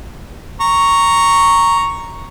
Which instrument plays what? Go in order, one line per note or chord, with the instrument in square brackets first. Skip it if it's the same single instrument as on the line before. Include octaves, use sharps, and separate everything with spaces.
[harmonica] A#5 C#6